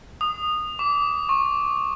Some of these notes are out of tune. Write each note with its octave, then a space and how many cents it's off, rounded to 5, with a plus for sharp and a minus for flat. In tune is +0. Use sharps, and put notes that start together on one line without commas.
D#6 -20
D6 -25
C#6 -25